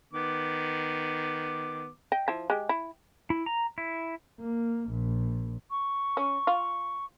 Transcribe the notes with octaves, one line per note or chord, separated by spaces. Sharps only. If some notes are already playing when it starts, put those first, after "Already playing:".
D#3 B3 D6
D#5 G5
F3 E4
G#3 G4
E4
E4
A#5
E4
A#3
A#1
C#6
C#4
F4